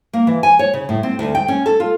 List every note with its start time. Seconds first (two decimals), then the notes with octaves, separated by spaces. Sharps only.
0.13 A#3
0.27 E3
0.43 G#5
0.59 C#5
0.74 C#3
0.89 A2
1.03 C4
1.19 D2
1.35 G5
1.48 C#4
1.66 A4
1.80 F4